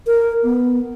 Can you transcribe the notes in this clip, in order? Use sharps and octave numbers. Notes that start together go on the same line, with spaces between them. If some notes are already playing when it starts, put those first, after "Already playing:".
A#4
B3